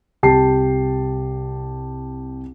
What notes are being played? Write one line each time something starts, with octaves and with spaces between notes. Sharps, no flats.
C2 G4 A5 C7